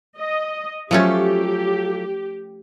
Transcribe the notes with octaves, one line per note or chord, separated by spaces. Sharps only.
D#5
F3 F#3 A3 C#4 F4 G4 A4